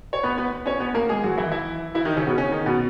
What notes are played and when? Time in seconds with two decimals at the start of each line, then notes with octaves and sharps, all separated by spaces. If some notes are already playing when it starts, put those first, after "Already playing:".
0.13 C#5
0.23 B3 B4
0.38 B3 B4
0.66 C#4 C#5
0.80 B3 B4
0.95 A#3 A#4
1.09 G#3 G#4
1.24 F#3 F#4
1.38 E3 E4
1.51 E3 E4
1.95 E3 E4
2.05 D#3 D#4
2.17 C#3 C#4
2.27 B2 B3
2.37 C#3 C#4
2.51 D#3 D#4
2.66 B2 B3